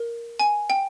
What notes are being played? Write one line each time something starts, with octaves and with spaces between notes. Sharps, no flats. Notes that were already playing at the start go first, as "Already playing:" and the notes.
Already playing: A#4
G#5
G5